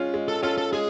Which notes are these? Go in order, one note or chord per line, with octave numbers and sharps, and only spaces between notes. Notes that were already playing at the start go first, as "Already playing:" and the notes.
Already playing: G#3 C#4 F4
G#3
A4
C#4 F4 A4
A4
G#3 G#4